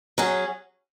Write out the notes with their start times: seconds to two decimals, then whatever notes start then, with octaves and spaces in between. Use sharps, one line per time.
0.18 F#3 C#4 G#4